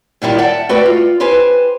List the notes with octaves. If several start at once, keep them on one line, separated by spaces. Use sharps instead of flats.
A#2 D#3 G3 E4
D5 E5 F#5 G5 A5
A3 F#4 B4 D5 E5 G5
F4
G4 B4 C5 G#5